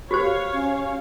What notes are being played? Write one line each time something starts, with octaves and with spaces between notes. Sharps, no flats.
F#4 G4 C5 C#5 F5
C#4